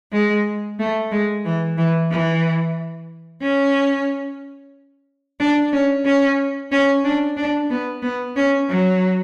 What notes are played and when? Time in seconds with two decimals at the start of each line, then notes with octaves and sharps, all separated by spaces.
0.13 G#3
0.79 A3
1.11 G#3
1.45 E3
1.77 E3
2.11 E3
3.42 C#4
5.40 D4
5.72 C#4
6.05 C#4
6.72 C#4
7.04 D4
7.37 D4
7.70 B3
8.02 B3
8.36 C#4
8.69 F#3